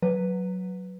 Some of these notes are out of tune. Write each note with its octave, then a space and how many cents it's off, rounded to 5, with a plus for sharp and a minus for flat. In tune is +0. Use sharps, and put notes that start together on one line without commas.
F#3 -5 B4 +0